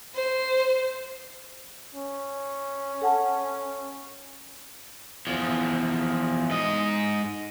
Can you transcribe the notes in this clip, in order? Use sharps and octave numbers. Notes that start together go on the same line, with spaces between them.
C5
C#4
A4 F#5 A5
E2 F3
G#2 D#5